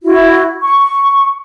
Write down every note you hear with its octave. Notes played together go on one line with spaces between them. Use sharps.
E4 F#4
C#6